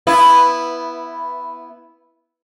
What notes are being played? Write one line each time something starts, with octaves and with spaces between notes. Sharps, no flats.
B3 E4